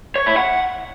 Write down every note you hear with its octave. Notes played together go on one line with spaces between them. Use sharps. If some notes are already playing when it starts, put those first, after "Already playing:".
C#5
E4
F#5